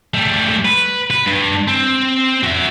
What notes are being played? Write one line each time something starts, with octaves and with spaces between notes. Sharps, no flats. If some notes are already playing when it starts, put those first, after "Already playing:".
G3 A3
B4
B4
G2
C4
F#4 E5